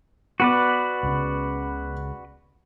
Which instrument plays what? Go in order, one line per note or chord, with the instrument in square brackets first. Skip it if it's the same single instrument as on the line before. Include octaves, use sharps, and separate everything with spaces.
[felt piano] B3 [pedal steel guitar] F#4 B4 D5
[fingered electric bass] C#2 C#3